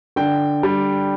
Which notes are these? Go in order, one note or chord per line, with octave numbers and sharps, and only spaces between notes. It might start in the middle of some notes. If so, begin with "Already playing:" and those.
D3 G5
G3